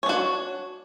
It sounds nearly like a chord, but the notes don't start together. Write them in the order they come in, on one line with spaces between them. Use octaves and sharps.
C#5 D4 F#4